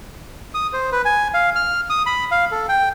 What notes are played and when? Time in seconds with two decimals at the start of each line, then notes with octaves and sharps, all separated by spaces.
0.54 D#6
0.73 C5
0.92 B4
1.05 G#5
1.34 F5
1.56 F6
1.90 D#6
2.06 B5
2.31 F5
2.51 A4
2.69 G5